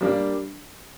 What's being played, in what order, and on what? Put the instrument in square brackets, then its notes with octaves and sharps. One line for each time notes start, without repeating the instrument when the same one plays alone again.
[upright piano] G3 A#3 D4